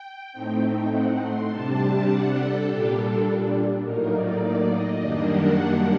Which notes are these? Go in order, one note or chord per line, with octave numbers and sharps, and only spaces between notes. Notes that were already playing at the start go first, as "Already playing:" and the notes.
Already playing: G5
A2 A3 C4 D#4
F#5
C6
C3 G3 D4 A5
F#5
A4
A#2 G3 D4 G4
A4
A2 F#3 A#3 D#4 A#4
D5
D5
D#5
F#2 D#3 G3 A#3 D4 D#5
F#5